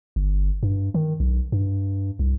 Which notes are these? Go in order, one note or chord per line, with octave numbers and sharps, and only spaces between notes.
G1
G2
D#3
B1
G2
C2